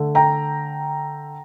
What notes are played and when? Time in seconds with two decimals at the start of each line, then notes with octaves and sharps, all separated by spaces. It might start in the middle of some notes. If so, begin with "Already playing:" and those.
Already playing: D3 A3
0.15 G5 A#5